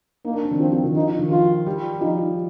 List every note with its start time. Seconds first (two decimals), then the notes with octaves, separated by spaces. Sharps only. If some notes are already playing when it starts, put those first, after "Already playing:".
0.25 A#3 D#4
0.33 D4
0.43 C4
0.51 D#3
0.60 F3 C4
0.72 F3
0.83 D#3
0.95 F3 D#4
1.19 D#3
1.30 F3 F4
1.66 G3
2.01 F3 D#4